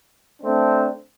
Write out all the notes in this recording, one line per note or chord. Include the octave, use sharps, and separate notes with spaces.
A3 C4 D4